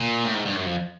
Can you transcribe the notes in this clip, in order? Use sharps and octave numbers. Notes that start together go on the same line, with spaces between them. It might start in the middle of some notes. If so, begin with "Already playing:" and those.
Already playing: A#2
A2
G#2
G2
F#2
F2